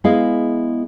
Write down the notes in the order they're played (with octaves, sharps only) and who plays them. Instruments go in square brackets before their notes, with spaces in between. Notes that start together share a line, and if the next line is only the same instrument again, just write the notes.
[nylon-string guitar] G#3 B3 E4 G#4 D#5 F5